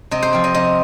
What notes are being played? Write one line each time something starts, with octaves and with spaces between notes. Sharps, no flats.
C3 D#5
C5
F3 C4
D#5
C3 D#5